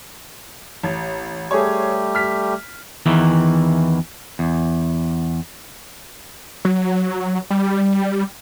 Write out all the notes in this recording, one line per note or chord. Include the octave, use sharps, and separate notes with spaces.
A1
G3 A3 G4 G#4 C#5
F6 B6
E2 D#3 E3
E2
F#3
G3